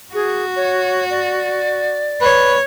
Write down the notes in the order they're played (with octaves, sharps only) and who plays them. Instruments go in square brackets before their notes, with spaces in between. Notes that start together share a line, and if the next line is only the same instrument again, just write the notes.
[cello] F#4 [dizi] G#4
[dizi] C#5
D5
[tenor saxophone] B4 [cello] C#5